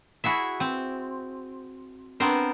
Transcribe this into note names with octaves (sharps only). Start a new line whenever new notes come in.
E4 F#4 G#4 E5
C4
B3 C4 D4 A#4 C5